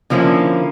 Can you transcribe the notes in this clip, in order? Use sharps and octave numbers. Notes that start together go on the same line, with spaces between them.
D3 F3 A#3 C#4 E4